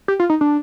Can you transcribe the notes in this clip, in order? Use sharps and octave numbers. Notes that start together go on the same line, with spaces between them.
G4
F4
D#4
D4